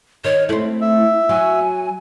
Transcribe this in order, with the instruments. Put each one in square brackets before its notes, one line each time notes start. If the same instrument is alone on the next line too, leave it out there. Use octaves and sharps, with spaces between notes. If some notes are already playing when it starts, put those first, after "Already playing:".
[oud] D#3 [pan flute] C#5
[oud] A3 C4 [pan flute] E4
[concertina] E5
[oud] F#3 [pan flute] G#5